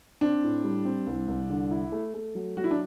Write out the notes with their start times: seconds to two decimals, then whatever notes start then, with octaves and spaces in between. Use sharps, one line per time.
0.21 C4 D4
0.43 A2
0.64 G3
0.85 C4
1.07 C2
1.28 C2
1.50 D3
1.71 E4
1.92 A3
2.14 A3
2.35 F#3
2.57 F#3 F#4
2.64 E4
2.71 D4